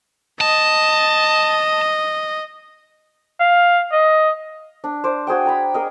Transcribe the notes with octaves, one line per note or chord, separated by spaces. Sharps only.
D#5 A5
F5
D#5
D4
C5 D5
F#4 G#4 C5 G5
G5 A#5 B5
G#4 A#4 D#5